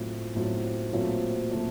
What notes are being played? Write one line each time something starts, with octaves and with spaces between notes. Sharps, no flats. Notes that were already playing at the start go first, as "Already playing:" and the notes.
Already playing: A2 F#3 C4 F4
A2 F#3 C4 F4
A#2 F#3 A3 C4 F4
A#2 F#3 A3 C4 F4